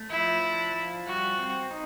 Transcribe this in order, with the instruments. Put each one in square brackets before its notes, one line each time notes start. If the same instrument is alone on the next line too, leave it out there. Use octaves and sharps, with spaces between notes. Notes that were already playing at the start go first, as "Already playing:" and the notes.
Already playing: [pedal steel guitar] A3
[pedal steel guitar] F3 [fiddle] E4
[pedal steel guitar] D4
F3
[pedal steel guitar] G3 [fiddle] F#4
[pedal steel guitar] C4
D#4